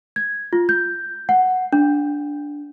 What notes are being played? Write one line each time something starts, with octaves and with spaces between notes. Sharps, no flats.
G#6
F4
G6
F#5
D4